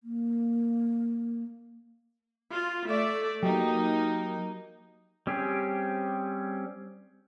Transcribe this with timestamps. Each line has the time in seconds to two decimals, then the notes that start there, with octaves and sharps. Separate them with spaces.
0.04 A#3
2.52 F4
2.86 A3 D5 E5
3.43 F#3 A#3 D#4 G4
5.27 G3 C4 C#4 G4 G#4